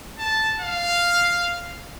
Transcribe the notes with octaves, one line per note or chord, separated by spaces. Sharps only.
A5
F5